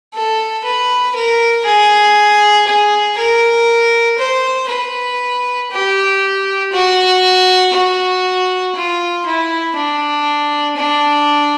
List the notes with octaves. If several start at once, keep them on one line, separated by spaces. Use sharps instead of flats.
A4
B4
A#4
G#4
G#4
A#4
C5
B4
G4
F#4
F#4
F4
E4
D4
D4